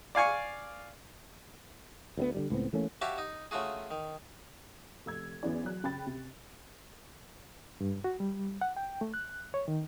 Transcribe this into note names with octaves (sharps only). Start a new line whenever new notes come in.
D5 F5 G#5 C#6
D2 F#3 B3
D3 D#3 G3
C#2 A2 B3 C4
E3 A3 A#3 C#4
F#4 G4 C#5 E5 F5 A5
D#4
C#3 A3 F4 F#4 G#4
D#3
F1 E6 G#6
E2 B3 C#4 E4 D5
F#3 F#6
C#3 G5 B5 A6
C3
G2
F#4
G3
F#5
G5
A3
F#6
C#5
D#3